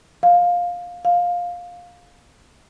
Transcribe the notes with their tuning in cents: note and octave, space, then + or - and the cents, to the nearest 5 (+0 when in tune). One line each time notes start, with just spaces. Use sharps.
F5 +15
F5 +15